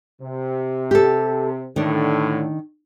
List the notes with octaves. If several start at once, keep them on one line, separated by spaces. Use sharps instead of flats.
C3
G4 A4
A2 D3 D#3 D4